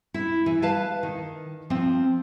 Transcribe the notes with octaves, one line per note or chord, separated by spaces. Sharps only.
E4
E3
B4 F5 A5
D#3
F3 C4